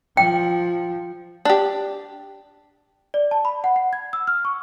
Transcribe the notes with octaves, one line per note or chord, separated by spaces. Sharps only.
F3 G5
D4 G4
D5
A5
B5
F#5
F#5
G#6
E6
F6
C#6